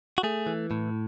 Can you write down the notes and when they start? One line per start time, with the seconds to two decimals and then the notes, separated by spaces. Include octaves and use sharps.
0.18 F#4
0.23 A3 G#4
0.47 E3
0.71 A2